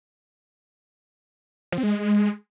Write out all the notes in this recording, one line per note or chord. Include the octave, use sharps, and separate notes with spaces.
F3
C4
G#3